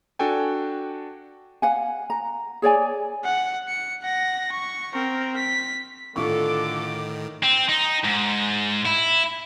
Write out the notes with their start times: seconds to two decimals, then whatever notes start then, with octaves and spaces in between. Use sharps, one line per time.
0.19 D4 F#4 A4 G5 G#5
1.62 F5 F#5 G#5
2.10 A#5
2.62 G#4 C#5 D5 G#5
3.25 F#5
3.68 C#7
4.02 F#5 A#6
4.52 C#6
4.93 C4 A#4
5.36 B6
6.16 A2 D3 D#3 F4 A4 C#6 D6
7.44 C4
7.69 D#4
8.04 G#2
8.86 E4